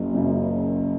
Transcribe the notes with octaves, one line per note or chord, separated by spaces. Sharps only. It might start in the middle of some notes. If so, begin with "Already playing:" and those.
Already playing: F#1 F#2 C#3
F#2 C#3